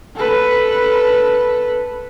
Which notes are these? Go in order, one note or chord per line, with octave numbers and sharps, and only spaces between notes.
A4 B4